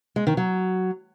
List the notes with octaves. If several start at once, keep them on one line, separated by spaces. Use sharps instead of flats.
G#3
D#3
F#3